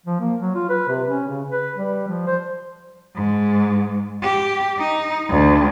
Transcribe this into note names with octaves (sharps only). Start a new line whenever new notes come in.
F3
A#3
F#3
F4
B4
C3
C#4
C#3
B4
G3
F3
C5
G#2
G4
D#4
D2